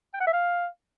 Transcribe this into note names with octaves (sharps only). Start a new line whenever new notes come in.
G5
F#5
E5
F5